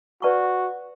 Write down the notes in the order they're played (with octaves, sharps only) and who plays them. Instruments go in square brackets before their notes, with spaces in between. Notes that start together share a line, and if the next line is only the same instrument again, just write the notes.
[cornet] F#4 [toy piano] B4 D5 A5 C#6